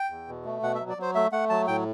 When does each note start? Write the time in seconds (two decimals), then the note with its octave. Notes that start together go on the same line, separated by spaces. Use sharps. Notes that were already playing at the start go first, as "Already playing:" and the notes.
Already playing: G5
0.10 E2
0.28 B2
0.45 A3
0.62 B2 F#5
0.75 E5
0.81 F#3
0.89 D5
0.97 F#3 C5
1.15 A3 E5
1.32 A3 F#5
1.50 F#3 A5
1.67 A2 G5